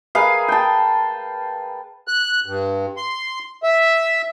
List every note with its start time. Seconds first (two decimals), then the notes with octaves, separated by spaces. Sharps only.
0.15 G#4 A#4 B4 F5
0.48 G5 A5
2.08 F#6
2.46 G2
2.97 C6
3.63 E5